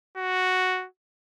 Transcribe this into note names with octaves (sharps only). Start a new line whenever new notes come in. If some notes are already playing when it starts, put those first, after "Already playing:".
F#4